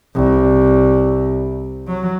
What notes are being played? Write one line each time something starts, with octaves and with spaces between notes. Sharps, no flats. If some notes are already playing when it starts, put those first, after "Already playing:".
C2
F#3